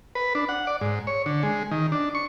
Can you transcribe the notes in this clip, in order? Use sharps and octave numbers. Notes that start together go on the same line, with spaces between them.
B4
D4
F#5
D5
G#2
C#5
D3
G#3
D#3
D4
C#6